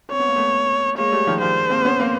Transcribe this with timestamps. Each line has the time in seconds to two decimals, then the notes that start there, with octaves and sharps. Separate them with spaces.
0.12 C4 C#5
0.19 B3
0.28 A#3
0.36 A3 B3
0.98 G#3 A#3 C#5
1.12 G3 A3
1.27 D#3 F3
1.41 F3 G3 C5
1.70 A#3 C4
1.85 B3 C#4
1.99 A#3 C4